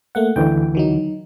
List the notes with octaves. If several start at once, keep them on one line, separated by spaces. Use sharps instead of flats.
A3 A#3 F#5
D2 D3 E3 G5
D#3 F#3 D#4